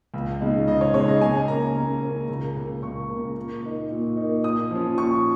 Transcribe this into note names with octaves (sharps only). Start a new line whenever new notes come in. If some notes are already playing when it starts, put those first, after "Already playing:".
C#2
C#3 G#3 D#4
C#2 D#5
C#5
C#3 G#3 D#4 C#5
D#5
C#3 G#5
A#3 C#4 A#5
C#3
A#3 C#4
C#2
C#3 A#3
C#2 C#6
C#3 A#3
A#2
A#3 D#4
A#2
A#3 D#4
A#2 D#6
F3 C#4
A#2 C#6